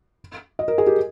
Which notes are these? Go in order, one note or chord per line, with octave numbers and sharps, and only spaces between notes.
D#5
A#4
G#4
G4